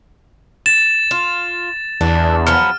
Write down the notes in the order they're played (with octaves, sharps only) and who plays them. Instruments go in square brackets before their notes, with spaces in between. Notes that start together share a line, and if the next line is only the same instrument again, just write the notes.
[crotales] A6 [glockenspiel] E7
[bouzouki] F4
[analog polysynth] E2 [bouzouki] D4
[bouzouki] F3 F#3 B3 [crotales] F6